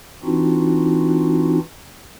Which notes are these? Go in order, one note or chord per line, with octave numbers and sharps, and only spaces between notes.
E3 C4 D4 D#4 F4 F#4